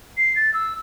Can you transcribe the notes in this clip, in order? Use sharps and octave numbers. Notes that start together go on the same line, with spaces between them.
C7
A6
E6